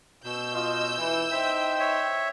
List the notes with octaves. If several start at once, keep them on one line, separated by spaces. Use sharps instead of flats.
B2 E6 G6
F4 D#5
E3
D#4 C5 E5 G5
C#5 E5